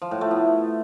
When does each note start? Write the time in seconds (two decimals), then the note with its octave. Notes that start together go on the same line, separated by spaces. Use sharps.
0.02 F3
0.11 A2
0.21 A3
0.31 B3